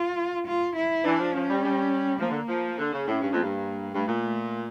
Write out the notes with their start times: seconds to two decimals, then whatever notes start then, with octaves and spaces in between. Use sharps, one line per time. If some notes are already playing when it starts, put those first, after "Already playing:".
Already playing: F4
0.47 F4
0.76 E4
1.05 E3 D4
1.19 F3
1.34 F3 C#4
1.48 G3
1.63 G3
2.20 F3 A#3
2.30 D3
2.48 F3
2.78 D3
2.92 C#3
3.06 A2 C#4
3.21 G2
3.32 F2 A#3
3.43 G2
3.93 G2 A3
4.08 A#2
4.22 A3